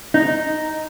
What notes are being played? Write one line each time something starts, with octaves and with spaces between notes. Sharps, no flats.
D#4